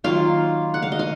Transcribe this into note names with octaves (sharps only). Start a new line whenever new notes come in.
D#3 F#3 A#3 F4 F5
F#5
F5
D#5
F5